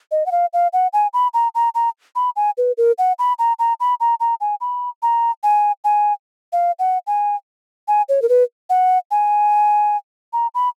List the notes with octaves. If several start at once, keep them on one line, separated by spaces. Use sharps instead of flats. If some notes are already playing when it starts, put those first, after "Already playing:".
D#5
F#5
F5
F5
F#5
G#5
B5
A#5
A#5
A#5
B5
G#5
B4
A#4
F#5
B5
A#5
A#5
B5
A#5
A#5
G#5
B5
A#5
G#5
G#5
F5
F#5
G#5
G#5
C#5
A#4
B4
F#5
G#5
A#5
B5